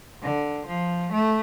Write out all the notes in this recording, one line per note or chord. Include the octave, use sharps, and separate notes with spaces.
D3
F3
A3